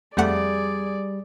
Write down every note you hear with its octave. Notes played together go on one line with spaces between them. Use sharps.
F2 G3 A3 G#4 D5 F#5